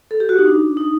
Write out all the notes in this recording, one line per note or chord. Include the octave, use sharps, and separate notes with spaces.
A4
G4
F#4
D#4
D4
D#4